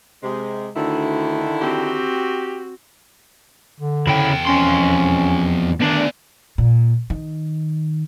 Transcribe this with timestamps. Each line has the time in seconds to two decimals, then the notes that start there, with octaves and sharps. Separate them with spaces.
0.23 C3 G#3
0.76 D2 D3 D#3 E4
1.61 C4 F#4 G4
3.80 D3
4.07 E2 C#3 E4 G5
4.47 F2 C#4 C6
5.81 D2 D#3 B3 D4 D5
6.58 A#2
7.10 D#3